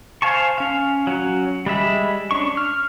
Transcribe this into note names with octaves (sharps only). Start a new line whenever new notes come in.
C5 F5 G#5 A5 C#6
C#4 F5
F#3 C#4
G3 G#3 E5 B5
C#4 D4 C#6
F6